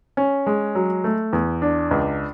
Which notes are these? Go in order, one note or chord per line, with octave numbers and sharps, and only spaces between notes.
C#4
G#3
F#3
A3
E2
D4
C#2